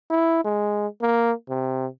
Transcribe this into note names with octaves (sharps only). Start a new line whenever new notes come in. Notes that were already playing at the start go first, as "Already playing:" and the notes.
E4
G#3
A#3
C3